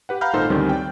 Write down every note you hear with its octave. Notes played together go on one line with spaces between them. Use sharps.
G4 B4 F#5
F5 F#5 A#5 B5 F6 G6
G#1 A#2 D#4 A4 C5 C6
D2 G2 D#3 G3 C4 C#4
D5 G5